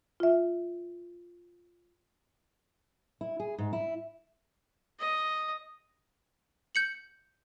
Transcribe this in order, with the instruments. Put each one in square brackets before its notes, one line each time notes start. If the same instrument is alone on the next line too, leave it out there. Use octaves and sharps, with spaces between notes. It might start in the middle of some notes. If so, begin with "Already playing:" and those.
[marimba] F4 E5
[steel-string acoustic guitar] E4
G#4
G#2
E4
[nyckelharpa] D#5
[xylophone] G6 C#7 F#7